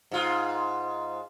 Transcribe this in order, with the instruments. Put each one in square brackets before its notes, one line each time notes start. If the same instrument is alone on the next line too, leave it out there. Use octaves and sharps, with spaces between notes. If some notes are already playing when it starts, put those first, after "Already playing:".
[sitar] G#2 F4